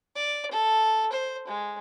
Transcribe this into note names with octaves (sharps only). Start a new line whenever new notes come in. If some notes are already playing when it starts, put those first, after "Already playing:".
D5
A4
C5
G#3